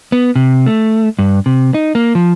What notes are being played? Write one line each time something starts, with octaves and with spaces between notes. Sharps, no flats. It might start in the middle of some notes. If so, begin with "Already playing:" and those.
B3
C3
A3
G2
C3
D#4
A#3
F3